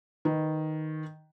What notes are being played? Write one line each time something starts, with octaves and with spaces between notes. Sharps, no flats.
D#3 B4